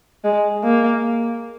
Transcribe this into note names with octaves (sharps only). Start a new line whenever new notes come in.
G#3
A#3